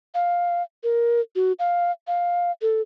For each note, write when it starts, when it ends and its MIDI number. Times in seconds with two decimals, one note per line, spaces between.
0.14 0.62 77
0.83 1.21 70
1.36 1.53 66
1.59 1.91 77
2.07 2.52 77
2.62 2.81 69